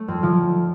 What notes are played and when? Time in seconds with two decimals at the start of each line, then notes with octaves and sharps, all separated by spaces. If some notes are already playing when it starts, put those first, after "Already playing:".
Already playing: A3
0.08 F2
0.23 F3